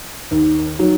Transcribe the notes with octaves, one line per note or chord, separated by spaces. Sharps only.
D#2
D#3 F#3